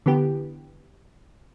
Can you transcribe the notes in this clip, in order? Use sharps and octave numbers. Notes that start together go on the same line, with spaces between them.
D3 E3 B3 G4